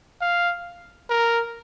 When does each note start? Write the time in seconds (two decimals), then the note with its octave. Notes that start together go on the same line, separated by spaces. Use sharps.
0.21 F5
1.10 A#4